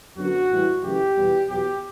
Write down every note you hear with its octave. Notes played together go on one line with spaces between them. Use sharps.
F#2 D3 F#3 B3 F#4
A2 E3 G3
F#2 C#3 E3 A3 G4
E2 B2 G3 B3
E2 B2 F#3 B3 G4